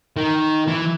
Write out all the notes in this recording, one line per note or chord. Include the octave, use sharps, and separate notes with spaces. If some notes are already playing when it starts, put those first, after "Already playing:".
D#3
E3